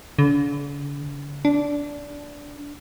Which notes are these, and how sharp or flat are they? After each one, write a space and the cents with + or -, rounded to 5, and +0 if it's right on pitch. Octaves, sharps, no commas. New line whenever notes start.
D3 -45
D4 -15